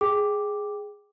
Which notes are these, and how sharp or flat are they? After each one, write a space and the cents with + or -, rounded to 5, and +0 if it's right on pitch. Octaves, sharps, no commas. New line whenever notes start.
G#4 +0 G5 +0 D6 +0